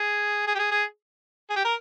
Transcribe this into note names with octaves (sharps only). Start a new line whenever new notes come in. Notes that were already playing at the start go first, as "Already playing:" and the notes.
Already playing: G#4
G#4
G4
G#4
G#4
G#4
G4
A#4